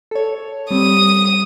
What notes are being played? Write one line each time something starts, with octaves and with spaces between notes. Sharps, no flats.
A4 C#5
G3 C4 D#6